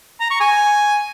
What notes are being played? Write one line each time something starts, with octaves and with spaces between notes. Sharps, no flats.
A#5
C#6
G#5